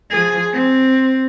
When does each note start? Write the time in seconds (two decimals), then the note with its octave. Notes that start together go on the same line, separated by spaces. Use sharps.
0.11 F3 G#4
0.53 C4